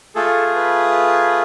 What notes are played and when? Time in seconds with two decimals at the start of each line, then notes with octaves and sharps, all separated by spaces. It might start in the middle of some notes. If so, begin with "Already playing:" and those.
0.15 A3 F4 G#4 A4
0.56 B4